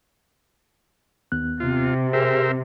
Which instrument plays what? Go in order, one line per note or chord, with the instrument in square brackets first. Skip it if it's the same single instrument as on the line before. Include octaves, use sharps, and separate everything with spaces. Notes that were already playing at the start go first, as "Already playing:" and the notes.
[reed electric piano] D#2 B3 F#6
[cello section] C3 [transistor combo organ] F4
[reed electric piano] G4 G#4 [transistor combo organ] A#4 C5 E5